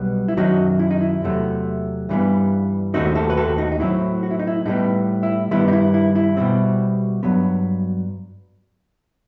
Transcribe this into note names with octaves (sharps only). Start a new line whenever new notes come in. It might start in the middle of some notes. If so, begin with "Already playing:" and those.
Already playing: B1 B2 G3 B3
E4
F#2 D#3 F#3 D#4 F#4
E4
D#4
E4
E2 C3 F#3 A3
G2 E3 G3 B3
D#2 D#3 A3 C4 D#4 F#4
F#4 A4
B4
F#4 A4
D#4 F#4
D#4
A2 F#3 C4 E4
F#4
E4
D#4
E4
A2 G3 B3 D#4
E4
G2 D#3 G3 B3 E4
D#4
E4
E4
E4
B2 G3 C4
G2 F#3 B3